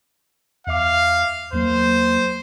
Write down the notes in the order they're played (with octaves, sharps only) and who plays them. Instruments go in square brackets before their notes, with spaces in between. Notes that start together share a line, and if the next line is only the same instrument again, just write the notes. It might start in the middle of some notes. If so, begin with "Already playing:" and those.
[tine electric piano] E2 E5 D6 [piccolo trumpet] F5
[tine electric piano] E2 F#3 A#3 [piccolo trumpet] C5